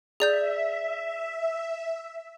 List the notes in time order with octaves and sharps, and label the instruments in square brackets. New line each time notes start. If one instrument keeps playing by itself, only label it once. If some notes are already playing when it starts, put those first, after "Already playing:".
[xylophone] G#4 D5 G6 [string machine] E5